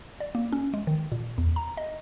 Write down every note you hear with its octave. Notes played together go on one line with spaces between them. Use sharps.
D5
A#3
C#4
G#3
D#3
A#2
E2
A#5
D#5